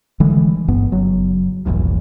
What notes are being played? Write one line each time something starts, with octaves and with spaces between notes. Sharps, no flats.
D3 E3 G3 G#3
G1 G2 B3
F#1 F#3
E1 A#1 E2 G2